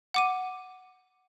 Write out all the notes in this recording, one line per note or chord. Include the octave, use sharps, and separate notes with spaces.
F#5 D6 D#7